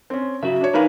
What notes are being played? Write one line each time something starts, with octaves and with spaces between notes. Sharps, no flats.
C4 C#4
C#3 F#3 F#4 E5
D4 C#5
E3 D#4 A#4 B4 F5 B5